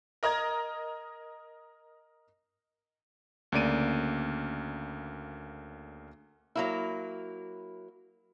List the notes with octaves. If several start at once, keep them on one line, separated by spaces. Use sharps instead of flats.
A#4 D#5 A#5 G#6
D2 C#3 A#3 D5 D7 D#7
F#3 A#3 E4